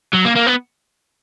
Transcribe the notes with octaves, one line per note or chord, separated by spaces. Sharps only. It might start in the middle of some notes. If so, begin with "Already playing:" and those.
F#3
A#3
A#3
B3